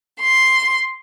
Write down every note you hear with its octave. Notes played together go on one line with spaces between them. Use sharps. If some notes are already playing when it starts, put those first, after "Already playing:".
C6